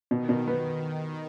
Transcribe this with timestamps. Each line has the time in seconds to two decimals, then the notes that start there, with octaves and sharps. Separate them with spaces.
0.11 B2 D#3
0.29 B2
0.47 B3